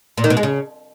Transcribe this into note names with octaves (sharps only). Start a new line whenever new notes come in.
A#2
D#3
B2
G#3
C#3